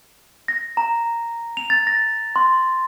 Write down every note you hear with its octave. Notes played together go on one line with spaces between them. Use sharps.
A#6
A#5
F7
A6
A#6
C6